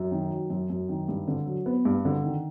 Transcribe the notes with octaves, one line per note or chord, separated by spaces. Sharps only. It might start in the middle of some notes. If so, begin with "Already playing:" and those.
Already playing: F#2
D#3
F#3
F#2
F#2
D#3
G2
D3
F#3
B3
G2
D3
D#3